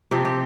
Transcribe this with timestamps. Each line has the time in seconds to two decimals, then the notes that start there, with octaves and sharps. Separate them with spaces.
0.11 C3 F3 C4 G4
0.25 G4